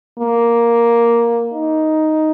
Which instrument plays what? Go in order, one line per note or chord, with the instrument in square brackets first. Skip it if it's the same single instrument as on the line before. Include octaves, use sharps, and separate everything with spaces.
[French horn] A#3
D#4